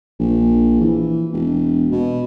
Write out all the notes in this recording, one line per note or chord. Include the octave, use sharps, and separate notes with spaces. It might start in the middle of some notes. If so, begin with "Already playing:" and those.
A#1
E3
E1
B2